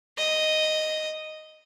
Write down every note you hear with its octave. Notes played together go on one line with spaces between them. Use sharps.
D#5